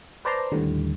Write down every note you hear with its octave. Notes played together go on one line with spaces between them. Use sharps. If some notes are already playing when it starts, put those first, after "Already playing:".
B4 C5 D5 A5 A#5 C6
D#2 A2 D3 G3